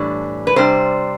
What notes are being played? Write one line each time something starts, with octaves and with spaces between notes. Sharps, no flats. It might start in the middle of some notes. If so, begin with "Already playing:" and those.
Already playing: A2 E3 G3 D4
B4
C3 G3 D4 C5